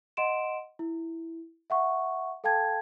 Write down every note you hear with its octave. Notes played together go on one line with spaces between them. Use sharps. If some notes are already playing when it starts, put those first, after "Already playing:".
D#5 F#5 C6 D7 E7
E4
E5 F#5 C#6
A4 F5 G5 A5 G#6